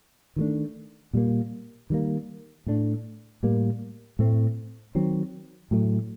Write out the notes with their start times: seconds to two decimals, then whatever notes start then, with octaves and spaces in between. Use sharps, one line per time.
0.36 D#3 F#3 A3 D4
1.13 A#2 G3 A#3
1.90 D#3 G3 A#3
2.66 A2 A3 D4
3.43 A2 G3 A#3
4.19 A2 A3 C4
4.95 D#3 F#3 C4
5.71 A2 F#3 A3